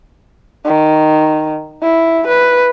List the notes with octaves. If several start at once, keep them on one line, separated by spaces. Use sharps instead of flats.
D#3
E4
B4